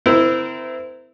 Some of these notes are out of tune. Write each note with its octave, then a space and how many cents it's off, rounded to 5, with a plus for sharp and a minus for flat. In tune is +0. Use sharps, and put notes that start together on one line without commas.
C4 -30 E4 +0 A#4 +0